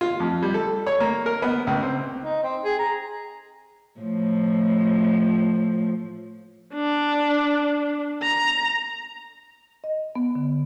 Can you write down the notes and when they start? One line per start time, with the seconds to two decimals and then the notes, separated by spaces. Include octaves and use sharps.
0.01 F4
0.20 F2
0.42 G3
0.54 A4
0.87 C#5
1.00 A#3
1.26 A#4
1.42 B3
1.67 C#2
1.82 C4
2.23 D#4
2.43 C4
2.65 G#4
2.79 A#5
4.00 A2 F3
6.74 D4
8.22 A#5
9.84 D#5
10.15 B3
10.35 D3